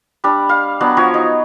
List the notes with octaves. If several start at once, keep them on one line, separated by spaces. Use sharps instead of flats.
G3 D4
F5
F#3 B3 D4 F#5
F3 F#3 F#4 C#5
D#4